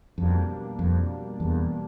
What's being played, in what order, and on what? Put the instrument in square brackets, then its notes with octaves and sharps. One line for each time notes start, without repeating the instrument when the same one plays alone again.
[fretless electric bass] F2 [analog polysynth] B2 G3 A#3 D4
[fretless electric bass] F2
E2